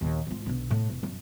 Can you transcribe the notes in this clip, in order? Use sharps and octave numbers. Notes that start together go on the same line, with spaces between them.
A#1 D#2
G#2 F4
B1 D3
A2
E1
F#2